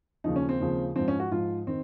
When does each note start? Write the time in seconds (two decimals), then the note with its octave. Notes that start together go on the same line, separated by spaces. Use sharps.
0.24 D#2 C#3 F3 D#4
0.36 C#4
0.49 C4
0.60 D#2 C#3 F3
0.96 F3 C4
0.99 G#2
1.08 C#4
1.20 F#4
1.31 G#2 F3 F4
1.67 D#3 C4